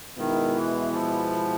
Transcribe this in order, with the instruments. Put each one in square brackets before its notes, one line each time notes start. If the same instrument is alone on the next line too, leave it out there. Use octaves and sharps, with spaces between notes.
[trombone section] B2 G#3 B3 E4 [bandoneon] D#3
[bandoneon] E3
F3